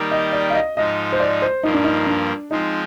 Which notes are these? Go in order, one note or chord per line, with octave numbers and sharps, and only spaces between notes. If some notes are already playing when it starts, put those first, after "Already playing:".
Already playing: D#3 G3 A#3 D#4 G4
D#5
D5
F5
D#5
G#2 F3 G#3 D#4 D#5
C5
D5
C5
G2 F3 A#3 D#4
D4
D#4
D4
F3 G#3 C4 D#4